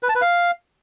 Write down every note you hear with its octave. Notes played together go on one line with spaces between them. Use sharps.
B4
A5
B4
F5